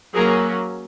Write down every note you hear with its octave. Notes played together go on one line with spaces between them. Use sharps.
F#3 A#3 C#4 G#4 A#4